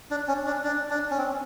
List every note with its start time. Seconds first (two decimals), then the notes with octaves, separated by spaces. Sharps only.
0.11 D4
0.28 C#4
0.47 D4
0.64 D4
0.91 D4
1.10 C#4
1.18 C4